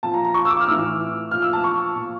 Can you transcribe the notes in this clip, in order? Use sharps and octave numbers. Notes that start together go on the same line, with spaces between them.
A#2 F3 A5
A#5
A#5
C#6
E6
D6
F6
A2 E3 E6
A#2 F3 F6
E6
A5
C#6
A#2 F3